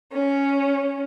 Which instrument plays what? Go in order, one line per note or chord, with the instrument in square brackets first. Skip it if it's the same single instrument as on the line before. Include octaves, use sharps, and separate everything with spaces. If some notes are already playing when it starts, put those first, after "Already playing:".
[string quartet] C#4